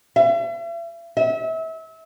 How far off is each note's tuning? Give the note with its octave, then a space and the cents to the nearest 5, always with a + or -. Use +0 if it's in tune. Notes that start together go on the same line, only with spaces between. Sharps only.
E5 +40
E5 -30